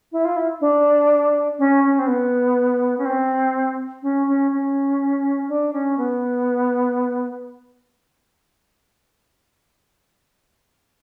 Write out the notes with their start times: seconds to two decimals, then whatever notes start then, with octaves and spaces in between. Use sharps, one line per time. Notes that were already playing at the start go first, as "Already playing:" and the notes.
0.12 E4
0.25 F4
0.36 E4
0.61 D4
1.59 C#4
1.83 C#4
1.99 C4
2.07 B3
2.98 C#4
3.05 C4
4.02 C#4
4.27 C#4
4.51 C#4
5.49 D4
5.73 C#4
5.97 B3